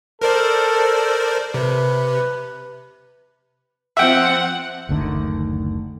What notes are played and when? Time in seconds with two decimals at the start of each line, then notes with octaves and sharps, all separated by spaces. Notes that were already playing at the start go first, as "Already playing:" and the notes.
0.22 A4 A#4 C5 D5
1.54 C3 B4
3.97 F3 C4 E5 F#5 G5
4.89 F#1 D2 D3 D#3